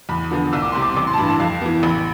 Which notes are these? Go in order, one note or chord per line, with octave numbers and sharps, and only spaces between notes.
E2 B5
D3 F3 B3
C2 E6
D6
C3 G3 C4 C6
D6
A1 D6
C6
A5
G2 E3 B5
A5
F2 F5
E3 B3
A1 B5